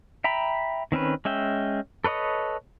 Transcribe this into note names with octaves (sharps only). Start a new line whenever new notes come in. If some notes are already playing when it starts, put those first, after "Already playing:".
E5 G5 A#5 B5
D#3 C4 C#4 B4
G#3 C#4 E5 G5
A4 B4 C#5 D#5 D#6